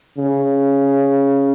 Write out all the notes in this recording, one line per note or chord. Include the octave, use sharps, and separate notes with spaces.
C#3